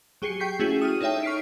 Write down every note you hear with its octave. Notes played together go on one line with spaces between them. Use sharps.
F#3 G4 G#4 C7 C#7
G5 C#6 G6 B6 C7
A3 C#4 E4 F#4 G#4
D#6 F6 D#7
D#4 A4 C#5 E5 G5
C#6 F6 B6 C7 D7